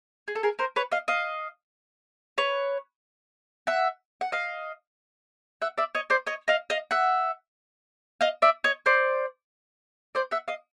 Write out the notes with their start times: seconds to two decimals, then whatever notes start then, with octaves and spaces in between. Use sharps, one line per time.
0.28 G#4
0.35 A4
0.43 G#4 A#4
0.59 A#4 C5
0.76 B4 C#5
0.92 D#5 F5
1.08 D#5 F5
2.38 B4 C#5
3.67 E5 F#5
4.21 F#5
4.32 D#5 F5
5.62 E5 F#5
5.78 D5 E5
5.95 C#5 D#5
6.10 C5 D5
6.26 C#5 D#5
6.48 D#5 F5
6.70 D#5 F5
6.91 E5 F#5
8.21 D#5 F5
8.42 D5 E5
8.64 C#5 D#5
8.86 C5 D5
10.15 C5 D5
10.31 E5 F#5
10.48 D#5 F5